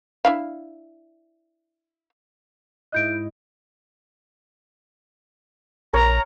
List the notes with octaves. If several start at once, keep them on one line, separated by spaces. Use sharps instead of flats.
D4 E4 F5
G#2 E4 D#5 F#6 G6 D7
A#1 A#4 C#5 A#5